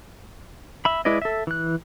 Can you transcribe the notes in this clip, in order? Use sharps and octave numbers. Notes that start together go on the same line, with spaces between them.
E5 B5
G#3 E4 B4 D5 D#5
A4 E5
E3 F#6